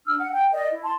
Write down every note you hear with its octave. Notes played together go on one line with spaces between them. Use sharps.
D4 E6 F6
F#5
G5
A#4 D5 D#5
E4
A5 C6